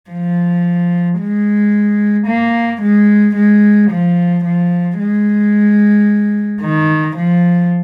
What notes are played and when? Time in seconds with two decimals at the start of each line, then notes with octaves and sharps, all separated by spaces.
0.11 F3
1.20 G#3
2.27 A#3
2.82 G#3
3.36 G#3
3.91 F3
4.44 F3
4.99 G#3
6.62 D#3
7.17 F3